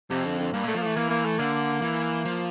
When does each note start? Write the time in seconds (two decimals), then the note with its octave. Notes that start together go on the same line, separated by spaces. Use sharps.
0.10 F2 C3
0.25 D3
0.39 D3
0.53 G2 A#3
0.64 A#2 A3
0.75 F3 A#3
0.82 E3 A3
0.96 E3 A#3
1.10 A#3
1.25 A3
1.39 D3 A#3
1.82 E3
2.25 F3